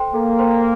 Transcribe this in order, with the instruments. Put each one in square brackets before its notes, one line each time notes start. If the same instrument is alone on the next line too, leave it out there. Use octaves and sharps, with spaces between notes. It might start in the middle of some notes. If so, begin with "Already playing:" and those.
Already playing: [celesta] A4 C5 G5 C6
[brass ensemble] A#3 [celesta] A4
[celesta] C5 G5 C6